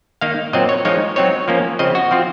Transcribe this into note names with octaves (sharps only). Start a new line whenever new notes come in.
D#3 A#3 D#4 F5
A#2 F#3 C4 D#5
C#5
F3 G#3 D#4 C#5
F#3 C4 D#4 C#5
F3 A#3 C#4
C#3 F3 C4 D#5
F#4
F3 C4 F4